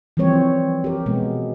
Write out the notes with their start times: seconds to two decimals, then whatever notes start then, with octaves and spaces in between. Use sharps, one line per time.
0.17 E3 F3 G3 C4 C#5
0.84 G4 A#4
1.06 B2 G#3 B3